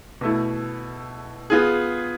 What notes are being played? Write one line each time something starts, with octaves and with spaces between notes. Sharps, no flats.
B2 A3 E4
B3 F4 G#4